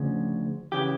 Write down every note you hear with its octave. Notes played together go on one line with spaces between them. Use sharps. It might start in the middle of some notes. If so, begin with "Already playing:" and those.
Already playing: D2 C#3 F3
C#3 E3 G4